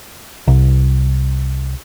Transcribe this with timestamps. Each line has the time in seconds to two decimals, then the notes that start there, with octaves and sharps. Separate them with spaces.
0.48 C2